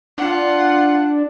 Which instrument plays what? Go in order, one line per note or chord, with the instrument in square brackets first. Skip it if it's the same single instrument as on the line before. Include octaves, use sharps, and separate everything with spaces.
[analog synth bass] D4 [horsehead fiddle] F4 F#5